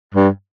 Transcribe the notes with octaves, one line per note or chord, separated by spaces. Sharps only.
G2